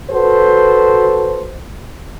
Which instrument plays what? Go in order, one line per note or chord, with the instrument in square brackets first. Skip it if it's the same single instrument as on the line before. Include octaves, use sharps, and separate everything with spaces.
[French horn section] F#4 A4 B4 C5